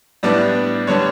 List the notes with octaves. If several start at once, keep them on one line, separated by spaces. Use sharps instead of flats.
A2 G3 B3 D4 D5
D3 G3 B3 D4 C#5